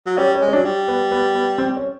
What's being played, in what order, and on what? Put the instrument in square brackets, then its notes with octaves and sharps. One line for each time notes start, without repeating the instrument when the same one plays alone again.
[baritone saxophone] F#3
[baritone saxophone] G3 [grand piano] C#4
[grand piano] C#4
[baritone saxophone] G#3
[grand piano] C#4
[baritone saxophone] F#3 [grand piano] D4
[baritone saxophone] G3
[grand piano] B3
B3
B3
C4
C#4